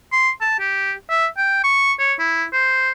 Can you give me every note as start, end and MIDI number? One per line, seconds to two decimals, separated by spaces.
0.12 0.30 84
0.41 0.56 81
0.59 0.93 67
1.10 1.27 76
1.37 1.61 79
1.64 1.93 85
1.99 2.14 73
2.19 2.45 64
2.53 2.92 72